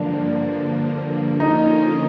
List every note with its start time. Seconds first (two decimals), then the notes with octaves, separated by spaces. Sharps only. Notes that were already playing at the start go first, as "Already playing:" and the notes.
Already playing: G2 D3 F3 A#3 D4
1.40 D3 F3 A#3 C#4 D#4 F4